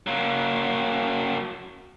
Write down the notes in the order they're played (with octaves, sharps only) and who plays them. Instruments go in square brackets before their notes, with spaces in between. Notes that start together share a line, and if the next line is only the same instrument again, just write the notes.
[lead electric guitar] F#3 A#3